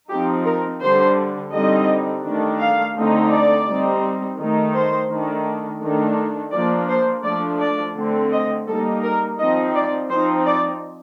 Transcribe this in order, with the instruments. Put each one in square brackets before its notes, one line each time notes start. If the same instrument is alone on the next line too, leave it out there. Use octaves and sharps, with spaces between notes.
[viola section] F3 C4 D#4 G4
A#4
D3 G3 D4 C5
D3 G3 C4 D#4 D#5
D#3 A3 D4
F5
D3 A3 C4 D#4
D5
G3 C4 D#4
D#3 A3 D#4
C5
D#3 A3 D4
D#3 A3 D4
F3 A#3 D4 D5
C5
F3 A3 D4 D5
D5
D3 A3 C4
D#5
G3 A#3 D#4 A4
A#4
F3 C4 D#4 D#5
D5
F3 C4 D#4 C5
D5